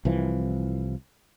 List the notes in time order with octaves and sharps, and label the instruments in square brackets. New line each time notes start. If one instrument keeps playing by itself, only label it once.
[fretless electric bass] C2 E3 F3